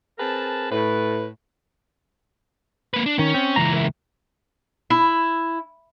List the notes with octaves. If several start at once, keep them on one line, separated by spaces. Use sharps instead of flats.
C4 G#4 A#4 B4 A5
A2 B4
A#3 B4
D4
D#3 C#4
C4
C#2 E3 A#5
A#4 E5
E4